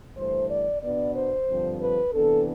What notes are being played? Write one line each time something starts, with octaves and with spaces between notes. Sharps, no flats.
G2 E3 A3 C5
D5
B2 B3 D4 D5
C5
G2 D3 F3 C4
B4
C3 E3 B3 D4 A4